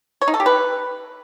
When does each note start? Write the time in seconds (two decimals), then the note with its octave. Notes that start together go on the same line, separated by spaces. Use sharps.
0.22 C#5
0.28 D#4
0.34 A4
0.40 G4
0.46 B4